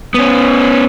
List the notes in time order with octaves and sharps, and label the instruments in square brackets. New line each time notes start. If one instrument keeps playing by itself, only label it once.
[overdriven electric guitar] B3 C#4